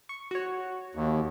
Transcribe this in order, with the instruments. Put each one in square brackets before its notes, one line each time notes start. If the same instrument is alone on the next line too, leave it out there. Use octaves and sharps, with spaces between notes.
[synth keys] C#6
F#4 C#5
[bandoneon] D#2